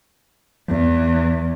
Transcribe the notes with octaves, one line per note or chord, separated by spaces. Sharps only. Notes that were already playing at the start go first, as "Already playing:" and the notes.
E2